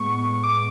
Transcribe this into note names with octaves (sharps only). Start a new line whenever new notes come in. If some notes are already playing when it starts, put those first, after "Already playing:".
Already playing: A2 G#3 B3 C#6
D6